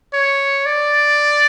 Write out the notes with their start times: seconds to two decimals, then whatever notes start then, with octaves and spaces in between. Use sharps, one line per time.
0.13 C#5
0.66 D5